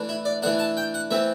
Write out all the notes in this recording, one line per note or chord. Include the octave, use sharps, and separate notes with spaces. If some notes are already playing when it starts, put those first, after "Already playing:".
Already playing: E3 A3 D4
E4
D5
E3 A3 D4 F#5
A5
G5
F#5
E3 A3 C4 E5